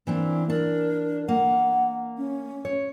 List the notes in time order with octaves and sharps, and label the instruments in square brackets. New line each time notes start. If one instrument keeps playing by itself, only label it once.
[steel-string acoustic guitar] E3 C4 D4 [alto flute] A#3
[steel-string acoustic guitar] D4 [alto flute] A#4
[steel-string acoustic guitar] A#3 [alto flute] F#5
[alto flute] C#4
[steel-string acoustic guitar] C#5